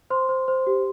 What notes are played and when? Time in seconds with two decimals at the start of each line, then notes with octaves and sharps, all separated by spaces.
0.10 C5 C6
0.29 C5
0.48 C5
0.67 G4